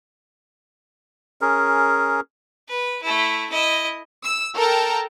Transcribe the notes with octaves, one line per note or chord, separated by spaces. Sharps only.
C#4 G#4 A#4
B4
A3 E4
E4 D#5
E6
A4 A#4 G5 A5 A#5